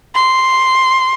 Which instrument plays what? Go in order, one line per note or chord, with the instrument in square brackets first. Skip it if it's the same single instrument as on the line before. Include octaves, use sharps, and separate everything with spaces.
[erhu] C6